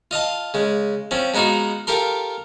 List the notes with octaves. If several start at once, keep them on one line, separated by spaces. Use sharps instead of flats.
F4 D#5 F5 A5
C#3 G#3
F3 C4 C#4
G#3 B3 D#4 F4 F#4
F4 G4 A4 A#4 C6